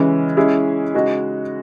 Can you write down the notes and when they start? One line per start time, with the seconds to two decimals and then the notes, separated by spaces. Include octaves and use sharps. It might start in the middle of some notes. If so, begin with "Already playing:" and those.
Already playing: C#3 E3 G#3 C#4
0.37 G#3 C#4 E4 G#4
0.94 C#3 G#3 D#4 F#4